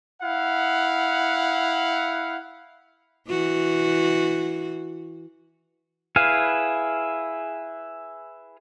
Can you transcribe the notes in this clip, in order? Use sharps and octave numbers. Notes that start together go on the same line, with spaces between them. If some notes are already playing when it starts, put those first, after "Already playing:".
E4 F5 F#5
E3 F#4
E4 G#4 B4 F5